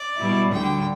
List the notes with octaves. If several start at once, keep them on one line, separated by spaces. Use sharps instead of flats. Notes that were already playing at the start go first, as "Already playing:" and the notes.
Already playing: D5
B2 G3 E4
D2 D3 G3 G5